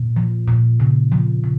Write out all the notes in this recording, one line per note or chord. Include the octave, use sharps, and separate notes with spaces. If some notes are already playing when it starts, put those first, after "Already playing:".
Already playing: A#2
F3
A#2
C#3
F3
C#3